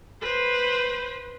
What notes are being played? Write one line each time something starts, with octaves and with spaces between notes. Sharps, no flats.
B4 C5